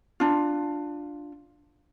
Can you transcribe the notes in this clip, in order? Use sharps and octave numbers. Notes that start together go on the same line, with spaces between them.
D4 F4